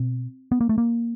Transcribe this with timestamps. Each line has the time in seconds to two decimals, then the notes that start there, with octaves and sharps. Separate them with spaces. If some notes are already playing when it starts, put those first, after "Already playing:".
Already playing: B2 C4
0.52 B3
0.61 A#3
0.69 A3
0.78 A#3